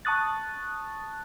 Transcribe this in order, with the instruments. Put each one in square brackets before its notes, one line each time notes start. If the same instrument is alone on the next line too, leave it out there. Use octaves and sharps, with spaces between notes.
[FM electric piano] A5 C#6 D#6 F#6 A6